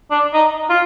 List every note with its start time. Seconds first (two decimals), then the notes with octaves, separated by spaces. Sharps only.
0.11 D4
0.33 D#4
0.70 F4